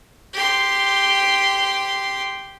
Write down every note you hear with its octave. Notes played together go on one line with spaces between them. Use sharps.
G4 C6